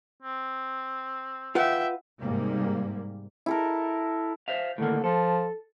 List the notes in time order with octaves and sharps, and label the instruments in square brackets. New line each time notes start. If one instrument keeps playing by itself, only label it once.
[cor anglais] C4
[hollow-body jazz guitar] F4 B4 F#5 [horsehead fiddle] E5 G5
[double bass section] G#2 C3 G3 A#3
[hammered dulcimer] E4 A4 A#4
[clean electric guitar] C5 E5 F5
[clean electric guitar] A2 D#3 A#3 [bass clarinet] D3
[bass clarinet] F3 [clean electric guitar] A4